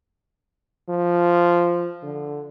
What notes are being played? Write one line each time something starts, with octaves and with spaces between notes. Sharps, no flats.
F3
D3